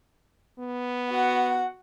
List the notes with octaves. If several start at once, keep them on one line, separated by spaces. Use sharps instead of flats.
B3
F#4 F#5